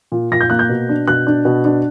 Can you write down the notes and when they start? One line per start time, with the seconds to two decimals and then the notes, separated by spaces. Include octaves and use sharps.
0.12 A#2
0.31 A#2 A#6
0.41 G6
0.50 A#3 F#6
0.59 G6
0.69 B2
0.89 D4
1.07 B2 F#6
1.27 D4
1.45 B2
1.65 D4